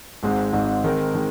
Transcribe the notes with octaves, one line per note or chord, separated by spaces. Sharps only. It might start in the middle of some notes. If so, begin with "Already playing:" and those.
G#1 G#2 G#3 C4 D#4
G#1 G#2 G#3 C4 D#4
D#3 G#3 C4 D#4 A#4
D#3 G#3